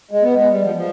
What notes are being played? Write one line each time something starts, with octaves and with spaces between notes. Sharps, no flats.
G#3
B3
G#3
G3
F3
F3